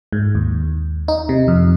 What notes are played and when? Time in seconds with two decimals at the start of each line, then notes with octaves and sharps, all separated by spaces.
0.13 G#2
0.35 D#2
1.08 D#4
1.29 C3
1.48 F2